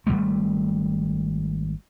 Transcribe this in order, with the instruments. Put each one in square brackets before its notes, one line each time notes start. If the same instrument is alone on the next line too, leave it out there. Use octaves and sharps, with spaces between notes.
[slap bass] G#1 F2 G3 A3